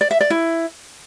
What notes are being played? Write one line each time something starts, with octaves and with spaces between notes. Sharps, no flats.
D5
E5
D5
E4